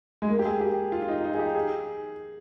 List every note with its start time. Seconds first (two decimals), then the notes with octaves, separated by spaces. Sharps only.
0.22 G#3
0.30 A#3
0.39 G4
0.45 G#4
0.61 G4
0.92 F4
1.02 F4
1.08 D#4
1.24 D#4
1.34 G#4
1.39 G4
1.55 G#4